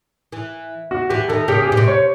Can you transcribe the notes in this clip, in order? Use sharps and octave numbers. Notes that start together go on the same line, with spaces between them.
E3
F#4
E3 G4
D#3 A4
C#3 G4
G#4
B2 G4
C3
C#5